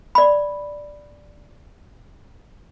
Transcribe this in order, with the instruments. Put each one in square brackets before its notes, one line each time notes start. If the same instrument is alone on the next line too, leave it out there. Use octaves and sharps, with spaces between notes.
[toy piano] D5 B5